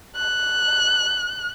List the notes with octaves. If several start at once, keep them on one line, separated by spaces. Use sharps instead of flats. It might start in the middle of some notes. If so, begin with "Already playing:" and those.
F#6